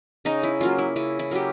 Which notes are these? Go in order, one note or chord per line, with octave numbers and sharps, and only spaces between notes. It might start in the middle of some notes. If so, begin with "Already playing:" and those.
C#3 D#4
E4
F#3 A#3 C#4 F4
E4
C#3 E4
E4
F#3 A#3 C#4 G4